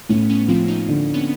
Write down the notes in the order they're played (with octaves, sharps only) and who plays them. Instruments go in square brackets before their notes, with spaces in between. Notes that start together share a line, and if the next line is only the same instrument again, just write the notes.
[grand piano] A2 [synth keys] B3 C#4
[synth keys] B3 C#4
[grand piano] F3 [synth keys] A#3 C4
[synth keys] C#4 D#4
[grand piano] D3
[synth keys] B3 C#4